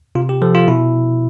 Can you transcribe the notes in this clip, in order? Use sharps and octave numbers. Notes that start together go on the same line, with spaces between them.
C3 F4
G4
F3 A4
F4
B2 E4